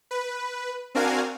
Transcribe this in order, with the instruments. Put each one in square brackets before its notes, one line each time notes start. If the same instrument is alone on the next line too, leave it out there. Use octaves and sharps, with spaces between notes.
[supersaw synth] B4
C4 D4 F#4 A#4 F5 G#5